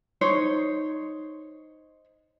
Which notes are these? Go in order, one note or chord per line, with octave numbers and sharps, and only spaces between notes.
D#4 C5 C#5